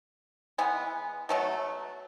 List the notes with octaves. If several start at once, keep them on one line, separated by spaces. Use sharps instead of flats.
E3 G#3 B3 G#5
B2 F#3 A3